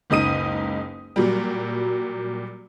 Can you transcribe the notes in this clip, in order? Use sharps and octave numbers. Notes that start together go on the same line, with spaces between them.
F#1 C#2 D#4 D#6 D#7
A#2 F#3 G3